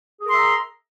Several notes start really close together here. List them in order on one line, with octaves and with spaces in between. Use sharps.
G#4 A#4 C6 E5 A#5